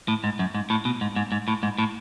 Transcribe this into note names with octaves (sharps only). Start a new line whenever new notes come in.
A2
G#2
F#2
G#2
A2
B2
G#2
G#2
G#2
A2
G#2
A2